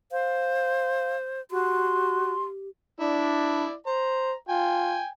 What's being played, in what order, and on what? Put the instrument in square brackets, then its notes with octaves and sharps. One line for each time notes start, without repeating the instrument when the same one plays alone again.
[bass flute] C5 [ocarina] F5
[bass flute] F#4 [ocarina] G4 [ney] C6
[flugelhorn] D4 [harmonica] E4 D5
[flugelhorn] C5 [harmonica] A#5
[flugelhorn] F4 [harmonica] G5 G#5